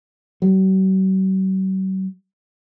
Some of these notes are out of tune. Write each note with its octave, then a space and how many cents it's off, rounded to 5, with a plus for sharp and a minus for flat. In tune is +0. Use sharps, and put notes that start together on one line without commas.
F#3 +45